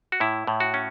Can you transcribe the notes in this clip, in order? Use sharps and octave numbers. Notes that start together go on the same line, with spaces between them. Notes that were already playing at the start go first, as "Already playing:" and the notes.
F#4
A2 E4
A2
F#4
C#4